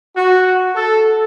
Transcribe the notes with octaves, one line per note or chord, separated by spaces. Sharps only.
F#4
A4